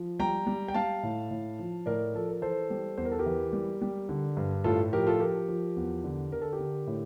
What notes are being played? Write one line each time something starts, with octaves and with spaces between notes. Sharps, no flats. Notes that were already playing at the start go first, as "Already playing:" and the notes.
Already playing: F3
G3 G5 A#5
G3
G5
G3 F5 A5
A2
A2
F3
A2 A#4 D5
F3 A4
A#4
E3 A4 C5
G3
E2 C5
A#4
A4
G4 A#4
E3
G3
G3
D3
G2
A2 F4 A4
F3 G4 A#4
F4 A4
F3 G4 A#4
F3
E2
D3
D3 A#4
A4
G4 A#4
D3
A2